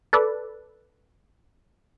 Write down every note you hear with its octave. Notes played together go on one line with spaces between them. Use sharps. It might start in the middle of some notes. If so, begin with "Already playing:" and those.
A4 B4 D5